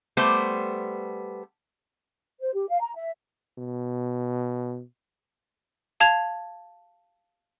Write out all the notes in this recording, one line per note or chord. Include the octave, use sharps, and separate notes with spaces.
G3 A3 B3 C5
C5
G4
F5
A#5
E5
B2
F5 A5 G#6 F7